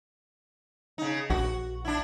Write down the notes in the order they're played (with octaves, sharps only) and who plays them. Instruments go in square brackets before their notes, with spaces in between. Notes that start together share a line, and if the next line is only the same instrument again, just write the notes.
[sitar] C#3 D#4
[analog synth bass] A#1 [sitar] F#4
[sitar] D4 E4